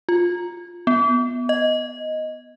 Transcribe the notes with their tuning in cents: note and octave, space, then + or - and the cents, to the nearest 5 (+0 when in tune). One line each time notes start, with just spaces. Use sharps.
F4 +10
B3 +0
D#5 +5